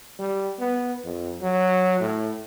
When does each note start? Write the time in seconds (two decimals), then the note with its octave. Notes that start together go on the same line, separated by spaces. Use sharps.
0.19 G3
0.59 B3
1.04 F2
1.41 F#3
2.00 A2